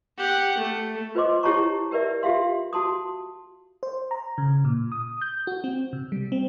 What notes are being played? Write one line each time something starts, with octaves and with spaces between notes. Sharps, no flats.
G4 F#5
A3
F4 B4 C5 D#5 C6 D6
E4 G4 C#5 A5 A#5 C#6
G4 A#4 B4 D5 E5
F4 G4 E5 F5 C6
F#4 A5 C6 D#6
C5
A#5
C#3
A#2
D#6
G6
F#4
C4
C3
G3
C4